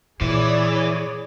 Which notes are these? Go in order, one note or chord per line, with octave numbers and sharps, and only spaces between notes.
A#2 E3 G#4 C#5 D5